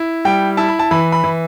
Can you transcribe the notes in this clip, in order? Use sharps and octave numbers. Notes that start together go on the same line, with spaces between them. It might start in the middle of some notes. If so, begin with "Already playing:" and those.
Already playing: E4
G3 G5
E4 A5
B5
A5
E3 B5
B5
E3